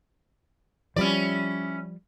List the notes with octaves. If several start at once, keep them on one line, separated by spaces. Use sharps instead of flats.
F3 G3 C#4 E4 D5